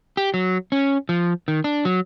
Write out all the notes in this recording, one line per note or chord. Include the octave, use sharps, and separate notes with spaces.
G4
F#3
C#4
F3
D#3
D4
F#3